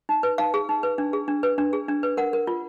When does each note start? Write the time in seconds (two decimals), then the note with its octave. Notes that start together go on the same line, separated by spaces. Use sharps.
0.09 D#4
0.23 B4
0.38 D#4 F5
0.54 G#4
0.69 D#4
0.83 B4
0.98 D4
1.13 G#4
1.28 D4
1.43 B4
1.58 D4
1.73 G#4
1.88 D4
2.03 B4
2.17 A#4 F#5
2.33 A#4
2.47 F4